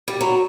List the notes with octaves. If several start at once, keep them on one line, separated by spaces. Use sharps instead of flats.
G3
F#3